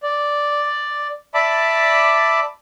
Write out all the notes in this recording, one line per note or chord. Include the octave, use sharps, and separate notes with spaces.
D5
D5 E5 A5 B5 D6